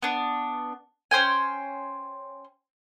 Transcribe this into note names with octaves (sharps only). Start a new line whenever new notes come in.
B3 D4
C#4 C5 G5 G#5